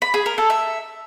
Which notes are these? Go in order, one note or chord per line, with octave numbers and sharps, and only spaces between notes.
B5
G#4
A#4
A4
E5